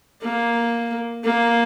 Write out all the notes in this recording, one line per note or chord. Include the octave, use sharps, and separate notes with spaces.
A#3
A#3